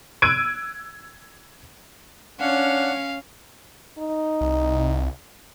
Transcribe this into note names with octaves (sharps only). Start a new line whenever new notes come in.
E6 F#6 G#6 D7 D#7
C#4 D4 C#5 F5 F#5
D#4
C2